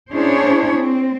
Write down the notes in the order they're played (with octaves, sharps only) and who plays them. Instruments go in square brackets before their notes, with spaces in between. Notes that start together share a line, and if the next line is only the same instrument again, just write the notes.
[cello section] C#4 D4 E4 G#4 C5 C#5
C4